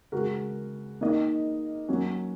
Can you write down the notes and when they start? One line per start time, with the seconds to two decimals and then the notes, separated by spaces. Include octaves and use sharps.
0.12 C#3 G#3 F#4 A#4
1.01 A#3 D#4 A#4 D#5
1.88 F#3 A#3 C#4 F#4